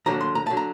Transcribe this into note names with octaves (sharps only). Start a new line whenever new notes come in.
D#2 D3 F#3 A#5
C6
A#5
D3 F#3 A5
A#5